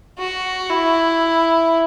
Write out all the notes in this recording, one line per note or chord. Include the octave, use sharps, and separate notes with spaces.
F#4
E4